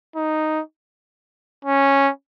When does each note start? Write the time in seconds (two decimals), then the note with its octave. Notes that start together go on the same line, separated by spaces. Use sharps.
0.16 D#4
1.65 C#4